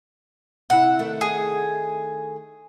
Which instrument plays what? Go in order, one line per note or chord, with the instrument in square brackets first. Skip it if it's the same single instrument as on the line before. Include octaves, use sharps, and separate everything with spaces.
[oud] C3 E4 [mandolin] F#5
[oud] D#3 A3
[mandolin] G#4